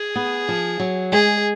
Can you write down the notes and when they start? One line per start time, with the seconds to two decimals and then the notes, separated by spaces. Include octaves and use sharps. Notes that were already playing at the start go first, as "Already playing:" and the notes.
Already playing: G#4
0.16 B3
0.49 F3
0.80 F#3
1.12 G#3 G#4